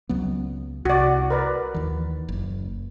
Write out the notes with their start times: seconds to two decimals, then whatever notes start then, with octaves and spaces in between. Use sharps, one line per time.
0.09 C#2 F#3 B3
0.85 C2 F#4 D5
1.30 A#4 B4 D5
1.74 D#2 E3
2.29 F#1